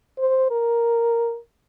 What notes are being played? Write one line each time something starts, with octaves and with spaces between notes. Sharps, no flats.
C5
A#4